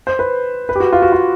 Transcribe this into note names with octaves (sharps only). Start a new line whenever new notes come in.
C5
B4
B4
G4
F#4
F4
F#4
F4